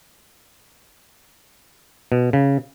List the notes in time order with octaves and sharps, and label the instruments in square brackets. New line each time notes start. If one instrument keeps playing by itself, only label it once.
[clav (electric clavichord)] B2
C#3